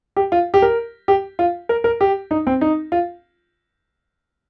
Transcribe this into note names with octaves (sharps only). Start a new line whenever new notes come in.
G4
F4
G4
A#4
G4
F4
A#4
A#4
G4
D#4
C4
D#4
F4